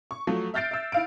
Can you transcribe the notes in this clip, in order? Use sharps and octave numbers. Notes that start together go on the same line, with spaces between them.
C#6
F3 F#3 A3 C#6
E5 F6 G6 A6 C7 D7
E5 E6
E4 F5 D7